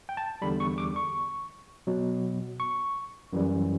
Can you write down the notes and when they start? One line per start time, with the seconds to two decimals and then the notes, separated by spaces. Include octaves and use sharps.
0.09 G5
0.17 A5
0.42 E2 D3 G3 B5
0.60 C#6
0.78 D6
0.96 C#6
1.87 B2 F#3
2.60 C#6
3.33 F#2 E3 G3